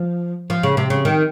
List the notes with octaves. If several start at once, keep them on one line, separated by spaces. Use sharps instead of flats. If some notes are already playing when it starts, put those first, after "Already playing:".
Already playing: F3
F3
C#3
C3
C#3
D#3